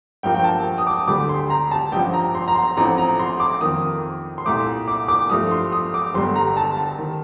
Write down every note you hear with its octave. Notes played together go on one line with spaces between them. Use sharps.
G2 F3 A#3 G5
G5
A5
D#6
D6
D2 D3 G3 D6
C6
A#5
A5
A1 G2 F3 G5
A#5
C6
A#5
C6
A1 A2 F3 C4 A#5
A#5
C6
D6
F2 D#3 A#3 D#6
C6
C2 A#2 A3 D6
D6
D6
G2 F3 A3 D#6
C6
D#6
D6
G1 G2 D3 G3 C6
A#5
A5
A5
D#3